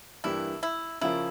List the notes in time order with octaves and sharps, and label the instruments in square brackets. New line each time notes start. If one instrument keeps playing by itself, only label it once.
[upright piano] G2 E3 A#3 D4 G4 [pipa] E4
[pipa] E4
[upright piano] C#3 F3 C#4 F4 A#4 [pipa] E4